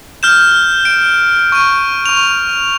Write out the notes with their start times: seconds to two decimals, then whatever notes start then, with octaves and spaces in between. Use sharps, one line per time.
0.23 F6 G6 E7
0.85 D7
1.52 C#6 D#7
2.06 C#6 F7